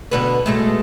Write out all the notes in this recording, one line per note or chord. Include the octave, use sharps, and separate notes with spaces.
B2 D3 B4
B2 G#3 A3